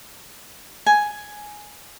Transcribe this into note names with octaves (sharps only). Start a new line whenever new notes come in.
G#5